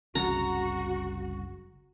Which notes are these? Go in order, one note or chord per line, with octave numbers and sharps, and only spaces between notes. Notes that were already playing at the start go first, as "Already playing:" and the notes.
F#1 C2 C#3 F#4 A#5